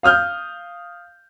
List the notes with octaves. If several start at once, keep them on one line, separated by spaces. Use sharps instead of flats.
F5 D#6 F6 G6